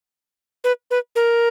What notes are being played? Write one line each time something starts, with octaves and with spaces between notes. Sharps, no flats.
B4
B4
A#4